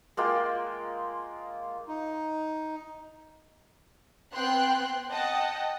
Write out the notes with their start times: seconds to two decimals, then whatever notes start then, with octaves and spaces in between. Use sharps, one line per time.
0.17 G#3 A#3 F4 G5
1.88 D#4
4.33 B3 C4 G5 C6 F#6
5.12 D#5 F#5 G5 A5